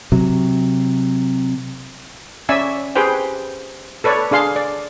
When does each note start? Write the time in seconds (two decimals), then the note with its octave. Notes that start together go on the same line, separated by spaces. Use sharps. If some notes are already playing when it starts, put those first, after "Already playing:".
0.12 C3 F#3
2.49 C#4 D5 E5 G#5 E6
2.96 G4 G#4 B4 C5 G5
4.04 A4 B4 C#5 D5
4.31 D4 G#4 F5 C6
4.56 D5